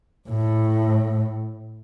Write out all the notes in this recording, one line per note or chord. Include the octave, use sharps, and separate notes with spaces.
A2